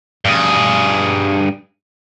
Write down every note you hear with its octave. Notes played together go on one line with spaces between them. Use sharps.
G2 G#4